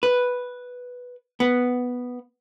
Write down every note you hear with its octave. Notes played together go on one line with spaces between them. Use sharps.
B4
B3